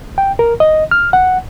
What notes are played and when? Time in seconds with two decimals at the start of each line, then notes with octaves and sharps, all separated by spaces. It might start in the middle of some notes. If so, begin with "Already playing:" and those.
0.18 G5
0.39 A#4
0.60 D#5
0.91 F6
1.13 F#5